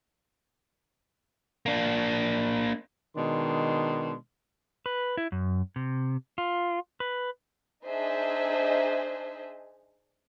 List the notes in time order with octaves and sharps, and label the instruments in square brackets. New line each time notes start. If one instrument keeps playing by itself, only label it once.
[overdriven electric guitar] A#3 D4
[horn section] B2 D#3 G#3 D4 C6
[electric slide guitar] B4
E4
F#2
C3
F4
B4
[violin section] D4 D#4 G#4 C5 D#5 E5